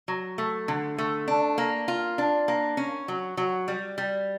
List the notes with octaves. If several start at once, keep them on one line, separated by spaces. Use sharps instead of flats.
F#3
A3
D3
A3
D4
A#3
F4
D4
A#3
C#4
F#3
F#3
G3
G3